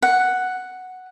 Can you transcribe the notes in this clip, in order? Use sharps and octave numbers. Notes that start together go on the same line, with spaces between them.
F#5